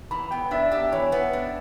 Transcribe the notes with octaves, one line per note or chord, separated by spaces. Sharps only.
E3 B5
B3 G5
D4 E5
G4 E5
E3 C#5
B3
D4